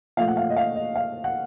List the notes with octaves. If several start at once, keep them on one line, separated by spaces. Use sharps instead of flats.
A#2 F3 A3 F5
F#5
F5
D#5
F5
D#5
F5
F#5